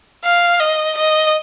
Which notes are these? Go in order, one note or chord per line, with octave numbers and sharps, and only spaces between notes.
F5
D#5
D#5